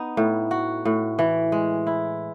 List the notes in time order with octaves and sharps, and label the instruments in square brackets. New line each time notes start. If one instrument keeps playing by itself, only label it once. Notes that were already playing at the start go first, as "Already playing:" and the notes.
Already playing: [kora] B3 D#4
A2
F#4
A2
E3
G#3
E4